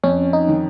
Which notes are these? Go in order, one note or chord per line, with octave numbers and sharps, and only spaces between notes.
F2 C#4
D#4
D#3